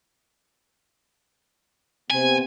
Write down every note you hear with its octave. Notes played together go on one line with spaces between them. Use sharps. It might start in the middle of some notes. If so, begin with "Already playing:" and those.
C3 B3 C4 G#5